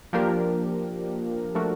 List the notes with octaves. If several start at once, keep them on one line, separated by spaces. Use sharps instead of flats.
F3 A#3 D4 G4 A#4
F3 A3 D4 F#4 A#4